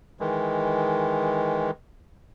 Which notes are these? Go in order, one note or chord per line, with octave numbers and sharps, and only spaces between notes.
D#3 E3 G#3